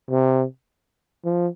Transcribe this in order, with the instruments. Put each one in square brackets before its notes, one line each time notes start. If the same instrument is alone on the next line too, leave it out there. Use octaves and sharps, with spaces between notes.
[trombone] C3
F3